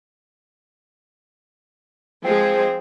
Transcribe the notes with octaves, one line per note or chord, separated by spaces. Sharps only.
F3 G#3 C4 G#4